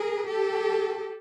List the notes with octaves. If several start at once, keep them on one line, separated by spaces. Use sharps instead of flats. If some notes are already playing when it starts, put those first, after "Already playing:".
Already playing: G#4 A#4
G4 A4